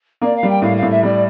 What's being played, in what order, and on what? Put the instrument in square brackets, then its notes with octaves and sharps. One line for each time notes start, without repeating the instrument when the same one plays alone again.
[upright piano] A#3 [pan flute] D5
[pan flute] F5
[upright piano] G3
[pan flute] G5
[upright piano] A2 [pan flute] F5
[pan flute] F5
[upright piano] A2
[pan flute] E5
[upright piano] G3 [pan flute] D5